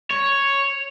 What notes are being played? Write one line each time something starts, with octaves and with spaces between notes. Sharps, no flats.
C#5